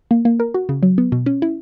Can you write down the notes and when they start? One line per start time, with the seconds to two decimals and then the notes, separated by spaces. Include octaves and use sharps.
0.11 A#3
0.25 A#3
0.40 A#4
0.54 F#4
0.69 C#3
0.83 F#3
0.98 B3
1.12 B2
1.26 C#4
1.42 E4